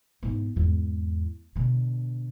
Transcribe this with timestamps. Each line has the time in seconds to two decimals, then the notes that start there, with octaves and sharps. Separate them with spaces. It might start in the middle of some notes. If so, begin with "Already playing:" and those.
0.23 G#2 B3
0.56 E2 G#2
1.56 B2 D3